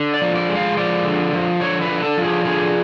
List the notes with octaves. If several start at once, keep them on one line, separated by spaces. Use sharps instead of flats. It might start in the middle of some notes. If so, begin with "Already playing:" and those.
Already playing: D3
D5
F3
D5
G#3
F5
F3 D5
D3
F3
D3 C#5
B4
D3
A4
F3
G#4
D3 G#4